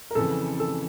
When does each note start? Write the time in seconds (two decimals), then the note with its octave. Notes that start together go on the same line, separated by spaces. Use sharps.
0.11 A#4
0.15 F2 C#3 E3 A4
0.60 A4